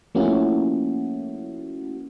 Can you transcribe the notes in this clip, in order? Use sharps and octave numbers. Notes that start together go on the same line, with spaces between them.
F3 A3 A#3 C#4 E4 F#4